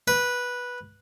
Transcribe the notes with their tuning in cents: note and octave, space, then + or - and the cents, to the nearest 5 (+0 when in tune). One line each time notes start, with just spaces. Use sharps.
B4 -10